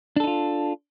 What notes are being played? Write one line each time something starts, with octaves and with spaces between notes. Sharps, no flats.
D4 D#4 F4 A4